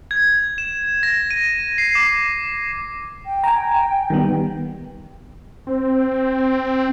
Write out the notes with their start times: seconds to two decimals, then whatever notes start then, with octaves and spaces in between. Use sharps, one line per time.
0.11 G#6
0.58 E7
1.03 A#6
1.31 D#7
1.78 C7
1.95 D6
3.26 G5
3.44 G#5 A#5
4.10 D#3 G3 B3
5.67 C4